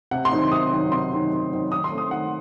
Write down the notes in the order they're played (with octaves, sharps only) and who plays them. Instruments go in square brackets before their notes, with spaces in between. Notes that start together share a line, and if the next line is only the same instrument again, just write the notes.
[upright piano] C3 F#5
C6
D#3 F#3 C4 D#4
C3 D#6
D#3 F#3 C4 D#4
C3 C6
D#3 F#3 C4 D#4
C3
D#3 F#3 C4 D#4
D#3 D#6
C6
A3 C4
D#6
D#3 F#5